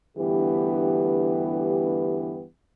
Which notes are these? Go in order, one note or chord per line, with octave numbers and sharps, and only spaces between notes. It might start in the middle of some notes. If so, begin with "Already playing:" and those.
D2 G2 E3 B3 G4